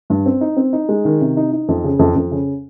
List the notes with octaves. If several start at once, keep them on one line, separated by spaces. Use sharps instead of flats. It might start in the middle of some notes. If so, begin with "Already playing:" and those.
G2
C4
D#4
C4
D#4
G#3
D#3
C3
D#4
D#4
F2
C#3
F2
F2
C#3